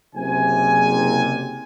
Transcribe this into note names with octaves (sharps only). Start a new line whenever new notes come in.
F#1 C3 G#5